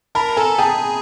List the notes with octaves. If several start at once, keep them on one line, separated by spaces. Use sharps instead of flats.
A#4 A5 B5
A4 G#5 A#5
G#4 G5 A5